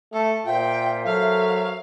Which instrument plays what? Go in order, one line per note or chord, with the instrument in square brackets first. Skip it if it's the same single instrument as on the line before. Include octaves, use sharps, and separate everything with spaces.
[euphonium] A3 [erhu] A4
[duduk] A#2 [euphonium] F4 [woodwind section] A#4 C5 E5 [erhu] G5
[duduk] F#3 [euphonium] A4 [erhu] F5